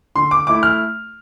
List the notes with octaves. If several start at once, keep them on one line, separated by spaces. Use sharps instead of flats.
D3 C6
D6
A3 E4 D6
F6